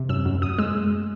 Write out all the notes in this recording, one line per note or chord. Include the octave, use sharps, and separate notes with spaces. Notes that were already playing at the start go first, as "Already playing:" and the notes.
Already playing: C3
F#2 E6
F#2
F#2 D#6
G#3 E6